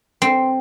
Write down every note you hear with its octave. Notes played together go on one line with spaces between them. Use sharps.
C4